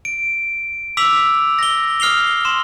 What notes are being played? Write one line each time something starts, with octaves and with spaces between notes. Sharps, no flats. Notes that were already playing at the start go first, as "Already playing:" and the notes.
D7
D6 E6 B6 F7 F#7
A#6 G7
D#6 F6 C7 F7 G7
C6 E7